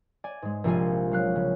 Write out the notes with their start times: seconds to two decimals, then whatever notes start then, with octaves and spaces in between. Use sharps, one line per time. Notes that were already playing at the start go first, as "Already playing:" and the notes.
0.24 D5 G#5
0.42 G#2 G#3
0.64 A#1 C3 F3 F4 G#5
1.12 F#3 F5 F#6
1.35 C#3